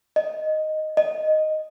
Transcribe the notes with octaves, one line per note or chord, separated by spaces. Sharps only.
D#5
D#5